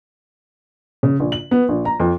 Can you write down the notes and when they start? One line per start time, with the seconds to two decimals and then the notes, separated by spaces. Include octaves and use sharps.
1.03 C#3
1.20 A#1
1.32 F#7
1.51 B3
1.69 A#1
1.85 A#5
2.00 F2